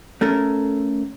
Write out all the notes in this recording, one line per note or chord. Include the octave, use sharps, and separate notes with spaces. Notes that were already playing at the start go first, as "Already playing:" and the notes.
A3 C#4 A4 A#4